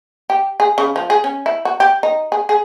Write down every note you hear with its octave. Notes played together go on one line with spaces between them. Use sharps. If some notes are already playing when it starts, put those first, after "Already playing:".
G4
G#4
C#3
F3
G#4
C#4
E4
F#4
G4
D#4
G#4
G#4